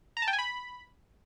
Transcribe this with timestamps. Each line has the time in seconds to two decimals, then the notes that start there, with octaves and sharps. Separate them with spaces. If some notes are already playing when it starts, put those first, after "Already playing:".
0.17 A#5
0.22 A5
0.28 G5
0.33 G#5
0.39 B5